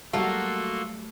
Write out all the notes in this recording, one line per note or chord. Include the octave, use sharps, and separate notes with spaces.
F#3 G3 A3 A#3 F4 F#4 A4 A#4